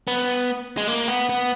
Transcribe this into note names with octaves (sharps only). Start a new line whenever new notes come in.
B3
G#3
A#3
B3
B3